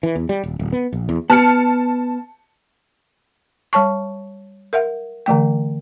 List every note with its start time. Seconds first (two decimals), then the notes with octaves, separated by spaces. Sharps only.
0.03 E3
0.16 E2
0.29 G3
0.43 D#1
0.59 D1
0.72 B3
0.93 A#1
1.09 E2
1.30 B3 A5 F6 C#7
3.73 G3 C#5 A5 C#6
4.73 A#4 E5 F#5
5.26 D3 E3 A3 G5